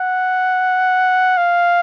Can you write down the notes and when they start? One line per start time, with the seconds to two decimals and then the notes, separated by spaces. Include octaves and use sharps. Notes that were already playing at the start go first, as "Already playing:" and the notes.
Already playing: F#5
1.38 F5